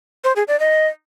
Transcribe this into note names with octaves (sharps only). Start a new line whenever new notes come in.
C5
G#4
D5
D#5